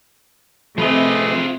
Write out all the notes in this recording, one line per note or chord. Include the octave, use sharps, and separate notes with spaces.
C3 F3 A3 F4 G#4 B4 D#5